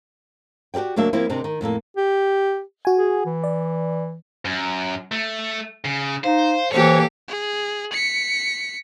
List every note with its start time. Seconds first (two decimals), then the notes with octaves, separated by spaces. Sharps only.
0.74 F#4 G4 A#4 D5 G5
0.96 D2 F#3 A#3 D4 E5
1.13 F3 A#3 C4 E4
1.29 C3 D#3 C4 D4
1.44 D#3
1.61 F2 A2 A#3 A4
1.97 G4
2.85 F#4 G#5
2.97 G#4
3.26 E3
3.44 D5
4.45 F#2
5.12 A3
5.85 C#3
6.24 D#4 C5 F5
6.72 E3 A#3 G4 A4 C5 C#5
7.28 G#4
7.93 B6 C#7